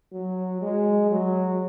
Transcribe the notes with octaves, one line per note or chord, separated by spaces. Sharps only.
F#3
G#3
F#3